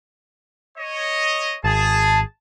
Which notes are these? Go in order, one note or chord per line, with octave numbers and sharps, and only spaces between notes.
C#5 D#5
G#1 G#4 A5